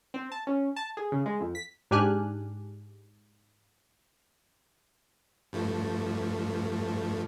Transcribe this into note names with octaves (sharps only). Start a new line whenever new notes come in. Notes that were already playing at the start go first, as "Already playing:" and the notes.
C4
A5
C#4
A5
G#4
C#3
G#3
F2
B6
G#2 D4 G4 G#5 F6 F#6
G2 F3 A3